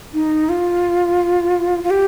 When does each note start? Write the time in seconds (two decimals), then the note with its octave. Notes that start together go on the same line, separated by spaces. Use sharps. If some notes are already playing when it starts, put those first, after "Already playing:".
0.14 D#4
0.49 F4
1.83 F4
1.90 G4